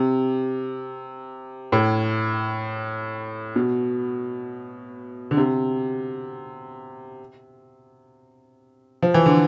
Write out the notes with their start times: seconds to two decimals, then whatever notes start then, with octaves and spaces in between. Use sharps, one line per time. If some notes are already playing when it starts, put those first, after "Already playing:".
Already playing: C3
1.72 A2
3.56 B2
5.31 D3
5.37 C3
9.02 F3
9.14 E3
9.26 D3